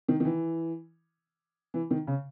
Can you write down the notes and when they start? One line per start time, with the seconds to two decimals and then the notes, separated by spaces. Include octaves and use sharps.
0.08 D#3
0.20 D#3
0.25 E3
1.74 E3
1.91 D#3
2.07 C#3